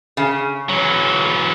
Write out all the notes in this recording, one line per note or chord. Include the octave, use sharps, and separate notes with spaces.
C#3
E3 F#3